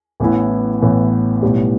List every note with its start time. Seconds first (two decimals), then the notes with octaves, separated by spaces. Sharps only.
0.20 A1 A2 E3 B3 E4
0.82 A1 A2 E3 B3 E4
1.42 B1 A2 G3 B3